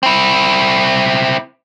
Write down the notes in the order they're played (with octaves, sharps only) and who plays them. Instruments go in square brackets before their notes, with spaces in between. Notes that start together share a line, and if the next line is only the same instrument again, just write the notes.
[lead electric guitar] C4 E4